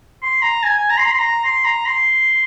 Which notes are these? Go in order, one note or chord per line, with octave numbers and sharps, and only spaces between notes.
C6
A#5
G#5
G#5
A#5
C6
A#5
C6
A#5
C6
A#5
C6